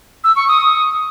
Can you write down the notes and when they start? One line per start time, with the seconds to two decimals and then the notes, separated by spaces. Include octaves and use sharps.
0.24 E6
0.36 C#6
0.48 D#6